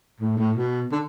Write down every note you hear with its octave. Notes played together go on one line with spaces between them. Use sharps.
A2
A2
B2
D3